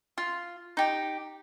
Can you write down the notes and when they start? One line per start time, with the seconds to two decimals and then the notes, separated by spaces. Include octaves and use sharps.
0.18 F4
0.77 D#4 G4